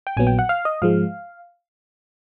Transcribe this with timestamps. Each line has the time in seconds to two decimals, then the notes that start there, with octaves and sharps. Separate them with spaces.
0.07 G5
0.17 A#1 A#2 F#3 B3 G#5
0.27 G5
0.39 F#5
0.49 F5
0.65 D#5
0.82 G#2 F3 G#3 F5